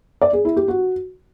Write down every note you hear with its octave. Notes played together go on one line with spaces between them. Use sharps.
D5
G#4
E4
G4
F#4